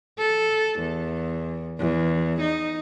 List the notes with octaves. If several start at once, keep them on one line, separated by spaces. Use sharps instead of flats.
A4
E2
E2
D#4